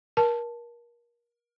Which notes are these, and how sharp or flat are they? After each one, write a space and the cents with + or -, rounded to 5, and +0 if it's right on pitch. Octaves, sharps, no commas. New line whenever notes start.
A#4 +30 A5 +0